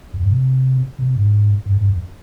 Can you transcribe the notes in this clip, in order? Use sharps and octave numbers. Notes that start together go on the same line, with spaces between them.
F2
G2
C3
C3
G#2
G2
G2
F2